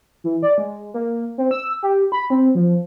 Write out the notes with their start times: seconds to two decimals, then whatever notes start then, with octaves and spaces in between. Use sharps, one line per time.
0.24 E3
0.43 D5
0.58 G#3
0.94 A#3
1.38 C4
1.51 E6
1.83 G4
2.12 B5
2.30 C4
2.55 F3